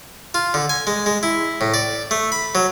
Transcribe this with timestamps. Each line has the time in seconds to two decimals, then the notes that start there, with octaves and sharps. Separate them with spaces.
0.34 F4
0.54 D3
0.69 G#5
0.87 G#3
1.06 G#3
1.23 E4
1.61 A2
1.74 D5
2.11 A3
2.32 B5
2.55 F#3